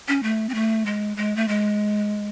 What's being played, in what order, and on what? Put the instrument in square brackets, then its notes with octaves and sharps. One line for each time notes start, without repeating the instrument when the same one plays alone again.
[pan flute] C#4
A3
C4
A3
G#3
G#3
A3
G#3